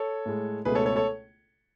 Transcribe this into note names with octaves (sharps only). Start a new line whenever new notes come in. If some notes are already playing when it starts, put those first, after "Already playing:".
Already playing: A4 C#5
A2 G#3
C#2 B2 A3 G#4 B4
A4 C#5
A4 C#5
A4 C#5